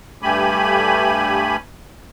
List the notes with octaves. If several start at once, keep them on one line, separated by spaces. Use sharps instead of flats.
G2 A3 G4 G#5 B5